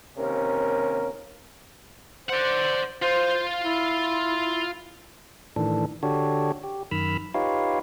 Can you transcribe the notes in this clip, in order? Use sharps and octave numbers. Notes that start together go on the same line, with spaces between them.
D#2 C3 C#4 A#4
C5 D5 F#5
F4 C5
E4
A2 D#3 E3 D4 A4
D3 D4 F#4 G4 A4 C#5
G4
F#2 D#3 B5 E6 F6
D#4 F4 G4 B4 C#5 F5